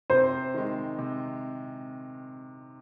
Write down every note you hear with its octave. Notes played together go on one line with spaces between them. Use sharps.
C3 C5
D#3 G#3
C3